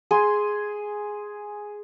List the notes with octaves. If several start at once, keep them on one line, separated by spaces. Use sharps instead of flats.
G#4 G#5 C6